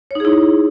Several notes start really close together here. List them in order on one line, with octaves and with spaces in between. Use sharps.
C#5 D#4 G#4 E4